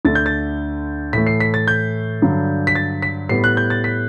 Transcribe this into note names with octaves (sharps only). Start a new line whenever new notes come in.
D2 D3 A3 A6
G6
A6
A2 E3 A3 B6
C7
B6
A6
G6
G2 D3 F#3
B6
A6
B6
A2 G3 B3 C7
F#6
G6
A6
B6